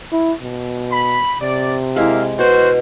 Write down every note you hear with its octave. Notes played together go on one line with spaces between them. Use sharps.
E4
B2
B5
C3 D5
G#3 A#3 E4 E5 F5
B2 F#4 C5